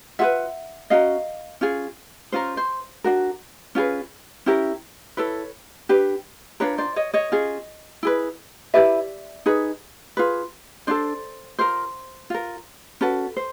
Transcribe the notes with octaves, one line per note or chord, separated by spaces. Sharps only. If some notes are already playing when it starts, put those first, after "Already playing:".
F4 G#4 B4 E5 F#5
C#4 F#4 A#4 D#5 F5
C#4 F4 G#4
C#4 F4 A#4 C5
C5
D4 F#4 A#4
C#4 F4 G#4 B4
C#4 E4 G4 A#4
E4 A4 B4 C#5
D4 G4 B4
D4 F4 A#4 B4 C#5
C5 D5
C#5 D#5
C#5 D#5
C#4 F4 G#4
E4 G#4 B4
E4 G4 B4 D5 E5
D#4 G#4 B4
F4 G#4 B4
D4 F4 A4 C5 D5
F4 A#4 C5
F4 A#4
C#4 F#4 A4 B4
C5